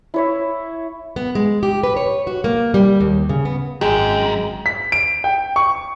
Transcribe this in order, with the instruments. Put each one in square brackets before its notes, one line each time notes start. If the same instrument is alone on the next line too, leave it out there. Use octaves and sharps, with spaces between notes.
[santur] E4 C#5 E5
[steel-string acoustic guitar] B3
G#3
G4
B4
C#5
F#4
A#3
G3
D#2
C#3
B3
[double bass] G#1 [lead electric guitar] F#2 [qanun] G#3 [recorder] G5
[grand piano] B6
D7
G5
C#6